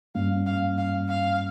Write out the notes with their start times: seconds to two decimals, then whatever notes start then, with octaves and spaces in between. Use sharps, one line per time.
0.15 G2 G3 A#3 C#4 F5
0.46 F5
0.78 F5
1.09 F5